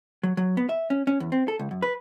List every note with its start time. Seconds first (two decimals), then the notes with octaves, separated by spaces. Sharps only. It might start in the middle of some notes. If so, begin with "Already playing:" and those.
0.23 F#3
0.37 F#3
0.57 B3
0.69 E5
0.90 C#4
1.07 C#4
1.20 E2
1.32 C4
1.48 A4
1.59 C#2
1.71 F#2
1.82 B4